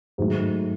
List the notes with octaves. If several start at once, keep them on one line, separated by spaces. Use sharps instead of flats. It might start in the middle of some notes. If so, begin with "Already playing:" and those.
G#2 D#3 F#3 A3